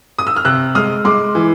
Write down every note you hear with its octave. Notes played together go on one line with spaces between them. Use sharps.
D#6
E6
F6
C3 E6 F#6
G#3 D#6 F6
G#3 C6 D6
E3